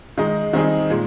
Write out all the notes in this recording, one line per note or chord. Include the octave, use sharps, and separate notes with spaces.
D#3 G#3 D#4
D#3 G3 C4 D#4 G#4
A#2 G#3